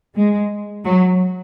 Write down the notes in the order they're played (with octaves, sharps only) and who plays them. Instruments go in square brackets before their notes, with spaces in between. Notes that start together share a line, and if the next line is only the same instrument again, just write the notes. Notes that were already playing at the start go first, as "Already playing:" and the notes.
[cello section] G#3
F#3